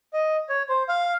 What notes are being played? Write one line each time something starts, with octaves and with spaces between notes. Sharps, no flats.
D#5
C#5
C5
F5